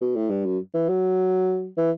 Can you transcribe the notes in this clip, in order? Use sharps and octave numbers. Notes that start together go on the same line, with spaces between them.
B2
A2
G2
F#2
E3
F#3
E3